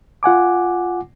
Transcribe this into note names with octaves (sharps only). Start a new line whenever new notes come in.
F4 F#5 G#5 D6